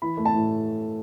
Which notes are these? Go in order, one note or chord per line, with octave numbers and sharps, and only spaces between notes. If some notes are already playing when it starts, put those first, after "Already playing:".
E3 B5
A3
A5
A2